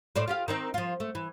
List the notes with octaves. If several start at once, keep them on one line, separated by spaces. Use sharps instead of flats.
A2 C5 D5
F4 G4 F5
D#3 C4 D#4
F3 F4
A3
E3